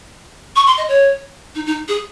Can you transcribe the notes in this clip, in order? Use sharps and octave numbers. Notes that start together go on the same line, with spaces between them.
C#6
C6
D#5
C#5
D#4
D#4
G#4